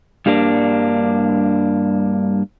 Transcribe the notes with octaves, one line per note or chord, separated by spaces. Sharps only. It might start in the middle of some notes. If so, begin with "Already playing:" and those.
G2 G3 A#3 D4